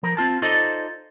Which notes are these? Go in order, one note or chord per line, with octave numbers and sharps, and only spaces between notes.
F3 A#4
C4 F4 A5
D#4 F4 A4 C5 D5 D#5